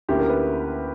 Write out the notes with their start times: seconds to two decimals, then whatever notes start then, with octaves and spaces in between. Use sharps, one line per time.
0.09 D2 D3 A#3 C#4 E4 G4
0.19 A#4
0.29 B4